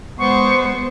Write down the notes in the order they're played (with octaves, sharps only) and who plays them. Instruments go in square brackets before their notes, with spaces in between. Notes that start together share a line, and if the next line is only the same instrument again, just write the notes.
[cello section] G#3 C5 [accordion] B3 [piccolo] C#6